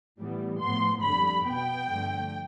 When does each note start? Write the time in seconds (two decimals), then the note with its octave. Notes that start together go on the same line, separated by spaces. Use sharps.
0.19 A2 E3 G3 B3
0.61 A2 F3 B3 C6
1.03 F2 D3 G3 B5
1.45 B2 B3 G5
1.88 G2 D3 F3 A3